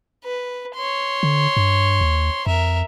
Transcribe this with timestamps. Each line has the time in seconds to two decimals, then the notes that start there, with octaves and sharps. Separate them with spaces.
0.24 B4
0.76 C#5 C6
1.23 D3
1.57 G2
2.01 D#2
2.47 F2 A#4 E5